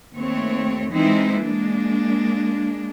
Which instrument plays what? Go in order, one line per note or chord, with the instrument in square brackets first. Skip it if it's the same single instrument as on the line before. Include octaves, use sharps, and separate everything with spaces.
[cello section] D#2 A3 C4 C#5
E3 G#3 C4 D#4 E4 C5
G#3 A#3 D4